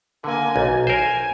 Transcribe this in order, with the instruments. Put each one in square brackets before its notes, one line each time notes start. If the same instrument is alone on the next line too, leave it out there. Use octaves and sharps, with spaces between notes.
[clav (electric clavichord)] D3 [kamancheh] A#3 G#5
[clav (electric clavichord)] B1
[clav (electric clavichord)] A#4 C5 [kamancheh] G#5